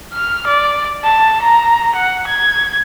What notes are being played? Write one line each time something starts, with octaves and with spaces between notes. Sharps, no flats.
F6
D5
A5
A#5
F#5
G#6